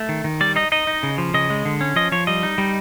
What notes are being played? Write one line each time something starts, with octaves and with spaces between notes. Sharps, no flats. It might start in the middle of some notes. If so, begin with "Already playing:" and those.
Already playing: A3
D#3
D#3
G3 D5
D#4 D#5
D#4 D#5
D#4
C#3
F3
C#3 D#5
G#3
D3
C#4
F3 D#5
F3 C#5
G3 D#5
D#4
G3